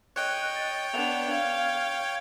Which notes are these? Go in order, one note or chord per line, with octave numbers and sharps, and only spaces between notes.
C#5 D#5 G5 F#6
A6
B3 D4 F7
F5 G#6